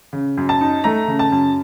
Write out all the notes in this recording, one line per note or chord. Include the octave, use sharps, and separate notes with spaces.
C#3
F#2
A5
D#4
A3 A#5
C#3
A5
F#2